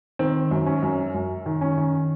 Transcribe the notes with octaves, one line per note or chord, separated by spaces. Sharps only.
D#3 C4
F#2
C#4
F#2
F#2
D#3
C#4
D#3